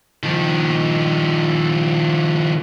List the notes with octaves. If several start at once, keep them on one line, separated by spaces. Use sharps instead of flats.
D#3 F3